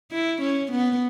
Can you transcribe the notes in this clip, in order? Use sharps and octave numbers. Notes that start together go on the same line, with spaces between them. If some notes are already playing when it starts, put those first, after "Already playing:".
E4
C#4
B3